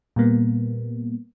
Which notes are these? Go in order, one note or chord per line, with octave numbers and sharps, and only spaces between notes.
A#2 G3 A#3 B3